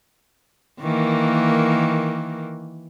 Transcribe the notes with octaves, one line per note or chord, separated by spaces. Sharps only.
D#3 E3 A#3